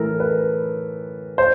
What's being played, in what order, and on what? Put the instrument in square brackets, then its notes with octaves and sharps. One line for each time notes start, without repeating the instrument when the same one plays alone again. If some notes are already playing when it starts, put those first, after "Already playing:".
Already playing: [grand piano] A2 E3 A4 A#4
B4
C5